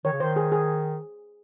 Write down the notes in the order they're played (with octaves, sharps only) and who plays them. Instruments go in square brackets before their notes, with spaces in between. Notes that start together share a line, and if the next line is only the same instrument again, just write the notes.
[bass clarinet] D#3 [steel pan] C#5
[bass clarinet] C#3
[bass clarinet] D#3 [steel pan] C5
[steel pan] G#4
G#4